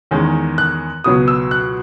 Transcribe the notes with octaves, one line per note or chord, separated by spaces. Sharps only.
E2 D#3 G#3 C#4
F#6
C#2 B2 F#3 B3 D#6
E6
F#6